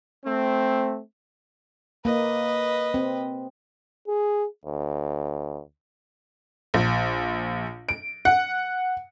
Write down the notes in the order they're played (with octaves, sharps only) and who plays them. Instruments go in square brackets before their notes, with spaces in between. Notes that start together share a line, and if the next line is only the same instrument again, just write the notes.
[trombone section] A3 C4
[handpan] A#3 [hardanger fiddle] B4 D#5
[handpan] C4
[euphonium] G#4
D2
[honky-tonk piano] A#1
D7
F#5